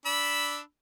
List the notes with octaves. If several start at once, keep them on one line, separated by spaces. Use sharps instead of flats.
D4 B5 E6